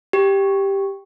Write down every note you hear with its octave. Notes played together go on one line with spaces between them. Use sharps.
G4